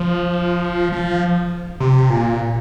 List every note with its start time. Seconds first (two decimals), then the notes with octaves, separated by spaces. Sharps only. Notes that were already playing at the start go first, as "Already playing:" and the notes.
Already playing: F3
0.92 F3
1.80 C3
2.10 A#2